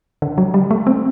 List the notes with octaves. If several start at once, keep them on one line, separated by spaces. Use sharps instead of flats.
D3
F#3
G3
A3
C4